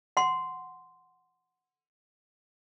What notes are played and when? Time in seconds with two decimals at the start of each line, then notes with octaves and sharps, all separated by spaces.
0.17 F#5 C6